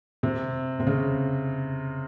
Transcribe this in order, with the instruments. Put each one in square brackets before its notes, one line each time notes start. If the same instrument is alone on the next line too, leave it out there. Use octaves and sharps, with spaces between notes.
[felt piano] C3
C3
C#3